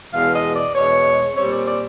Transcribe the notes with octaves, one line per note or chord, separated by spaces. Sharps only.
E2 B2 G#3 F5
D#5
D5
E2 B2 G#3 C#5
A#2 G3 C4 C#5
D5
D5